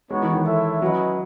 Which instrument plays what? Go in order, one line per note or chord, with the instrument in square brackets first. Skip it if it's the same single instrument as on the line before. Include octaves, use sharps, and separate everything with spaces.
[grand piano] G#3 [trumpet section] B3 D#4 F#4 C#5
[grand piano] E3
D#3
[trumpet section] E4 A4 C#5 E5
[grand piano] F#3 [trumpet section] C#4 E4 B4 D#5